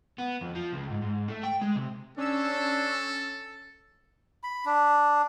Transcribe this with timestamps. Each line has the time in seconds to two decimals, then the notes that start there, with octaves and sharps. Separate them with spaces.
0.18 B3
0.41 F2
0.55 F3
0.73 C#2
0.90 G#2
1.02 G#2
1.28 A3
1.43 G5
1.62 G#3
1.76 C3
2.18 C#4 D4 A4 E6
4.43 B5
4.65 D4